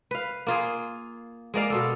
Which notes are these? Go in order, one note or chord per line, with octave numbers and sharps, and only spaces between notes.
B4 F5
A#3 F4 G#4
G#3 A#3 D5 F5
B2 F4 A4